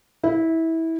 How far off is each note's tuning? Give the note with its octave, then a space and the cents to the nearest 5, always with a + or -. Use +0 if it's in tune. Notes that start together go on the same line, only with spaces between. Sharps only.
E4 -20